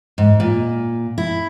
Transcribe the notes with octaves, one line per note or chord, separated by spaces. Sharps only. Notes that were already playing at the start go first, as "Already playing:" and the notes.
G#2
A#2
E4